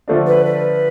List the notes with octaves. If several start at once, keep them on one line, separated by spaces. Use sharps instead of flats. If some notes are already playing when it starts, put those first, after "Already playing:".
D3 F3 A3 D4
B4
B4